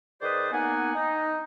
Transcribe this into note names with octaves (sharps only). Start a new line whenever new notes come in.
D#3 G#4 B4 C5 D5
A#3 B3 D#4 F#5 G#5
D#4